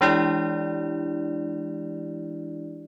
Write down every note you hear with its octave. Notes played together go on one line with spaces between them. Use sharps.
E3 G#3 D4 E4 G4 D5